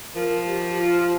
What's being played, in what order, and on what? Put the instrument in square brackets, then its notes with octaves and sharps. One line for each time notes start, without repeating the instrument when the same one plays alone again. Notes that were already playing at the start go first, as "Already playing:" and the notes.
[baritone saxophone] F3 [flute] A#4
[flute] G4
F4